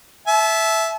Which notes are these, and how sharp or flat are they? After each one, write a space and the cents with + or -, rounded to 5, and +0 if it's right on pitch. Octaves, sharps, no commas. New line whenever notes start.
E5 +0 A5 -35